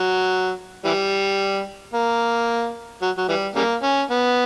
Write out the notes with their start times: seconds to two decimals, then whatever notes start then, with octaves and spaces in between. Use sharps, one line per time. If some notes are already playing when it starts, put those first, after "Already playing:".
Already playing: F#3
0.85 E3 G3
1.93 A#3
3.02 F#3
3.17 F#3
3.28 E3 G3
3.56 C#3 G3 A#3
3.83 C#4
4.10 B3